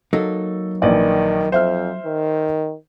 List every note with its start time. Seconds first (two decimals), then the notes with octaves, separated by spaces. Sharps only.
0.13 F#3 A#3 D#4 A4
0.82 A#1 D#3 E3 D5
1.52 F2 C5 E5 F6
2.06 D#3